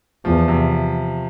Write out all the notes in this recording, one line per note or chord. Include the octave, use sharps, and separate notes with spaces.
E2 F3
C3